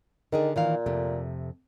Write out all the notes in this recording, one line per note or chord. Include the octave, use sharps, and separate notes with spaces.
D3 D#3 D4 G#4
A#2 D#3 E3 F5
F2 C3 A3